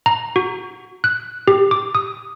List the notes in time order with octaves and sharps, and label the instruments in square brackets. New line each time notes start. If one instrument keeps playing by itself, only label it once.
[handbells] A#5
F#4
F#6
G4
D6
D#6